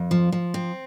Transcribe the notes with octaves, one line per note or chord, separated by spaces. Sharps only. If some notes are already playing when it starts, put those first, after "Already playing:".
Already playing: F2
F3
F3
C4